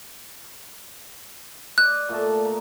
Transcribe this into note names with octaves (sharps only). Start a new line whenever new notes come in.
D5 D#5 F#6
A#2 A3 A5
A#5